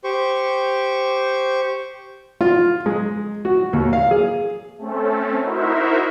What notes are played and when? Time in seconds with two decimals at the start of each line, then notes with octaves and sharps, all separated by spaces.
0.04 G4 C5 C#6
2.41 F4
2.86 G#3
3.45 F#4
3.73 D#2
3.93 F5
4.11 G#4
4.78 A3 C4 C#4 A4
5.41 D#4 E4 F#4 A#4 C5 E5